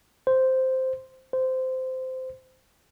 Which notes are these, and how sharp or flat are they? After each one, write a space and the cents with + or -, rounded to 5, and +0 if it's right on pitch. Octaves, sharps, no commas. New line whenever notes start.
C5 -5
C5 -15